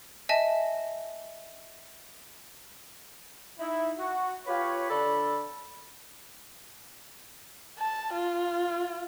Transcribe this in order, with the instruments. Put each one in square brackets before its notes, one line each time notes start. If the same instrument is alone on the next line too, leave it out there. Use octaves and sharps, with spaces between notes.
[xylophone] D#5 E5 G#5 A5
[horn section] D#4 E4
F#4
F4 G4 B4 C#5
D3 D4 A4 B5
[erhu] A5
F4